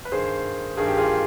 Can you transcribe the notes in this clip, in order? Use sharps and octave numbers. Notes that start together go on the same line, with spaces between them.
B4
G2 D#3 G#4 C5
G2 D#3 G#4
G4
F4 G#4